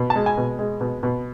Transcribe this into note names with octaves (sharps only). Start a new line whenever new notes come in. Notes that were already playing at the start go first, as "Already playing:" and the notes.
Already playing: B2
A5
G#3
G#5
B2
G#3
B2
B2